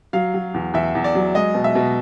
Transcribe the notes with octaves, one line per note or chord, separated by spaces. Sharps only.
F#3 F5
F#3
E2
E2 E5
E2
D5
F#3
G#3 D#5
B2
E5
B2